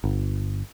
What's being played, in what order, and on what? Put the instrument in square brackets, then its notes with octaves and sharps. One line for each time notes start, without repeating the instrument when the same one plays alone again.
[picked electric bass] G1